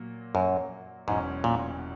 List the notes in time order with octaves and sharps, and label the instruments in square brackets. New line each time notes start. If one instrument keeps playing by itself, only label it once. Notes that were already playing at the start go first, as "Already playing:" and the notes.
Already playing: [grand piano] A#2 F#3 A#3
[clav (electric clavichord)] F#2
[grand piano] E1 E2 B2 F#3 C#4 [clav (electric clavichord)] G#2
[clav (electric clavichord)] A#2